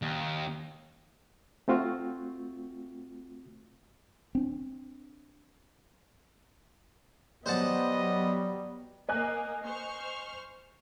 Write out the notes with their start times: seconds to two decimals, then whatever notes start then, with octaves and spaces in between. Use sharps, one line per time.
0.02 D#2
1.68 A3 C4 F4 F#4
4.35 C4 D4
7.46 F#3 G3 B3 C5 D#5 F#5 A5
9.09 A#3 D#5 G#5 F#6
9.64 C5 C#6 F6